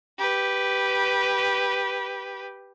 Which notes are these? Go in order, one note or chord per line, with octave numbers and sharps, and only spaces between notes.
G4 B4